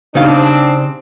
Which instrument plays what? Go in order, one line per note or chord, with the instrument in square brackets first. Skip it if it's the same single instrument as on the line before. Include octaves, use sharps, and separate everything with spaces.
[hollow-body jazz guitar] C#3 D#4 F5 [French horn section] G3 C4 D4